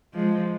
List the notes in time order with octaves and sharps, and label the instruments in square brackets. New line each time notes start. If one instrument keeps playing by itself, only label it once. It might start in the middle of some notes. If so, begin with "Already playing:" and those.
[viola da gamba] F3 G#3